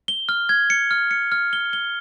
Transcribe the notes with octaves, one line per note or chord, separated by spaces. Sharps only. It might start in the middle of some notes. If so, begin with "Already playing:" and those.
G7
F6
G#6
C#7
F6
C#7
F6
G7
G7